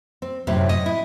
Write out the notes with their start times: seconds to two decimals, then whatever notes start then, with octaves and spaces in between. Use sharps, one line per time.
0.22 C4
0.47 F#2 A2 C3
0.69 D#5
0.86 E4